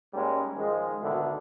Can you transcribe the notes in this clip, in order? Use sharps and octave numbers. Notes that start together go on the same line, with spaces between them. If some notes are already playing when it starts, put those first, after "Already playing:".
G#2 G3 G#3 A#3 C#4
G#2 D#3 F3 G#3
G#1 D2 B2 D3 D#3 E4